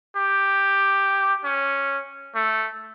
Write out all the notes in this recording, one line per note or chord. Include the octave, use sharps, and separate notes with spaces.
G4
C#4
A3